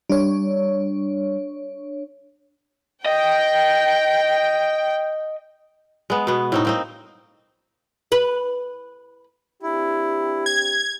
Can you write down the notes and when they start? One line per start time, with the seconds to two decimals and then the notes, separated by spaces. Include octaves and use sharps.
0.10 G3 D4 C#5
3.06 D#5 G5
6.10 G#3 B3
6.27 B2 B3
6.52 A2 C4 D#4
6.65 A#3 C4 D#4
8.12 B4
9.63 C4 D4 E4 G4
10.46 G#6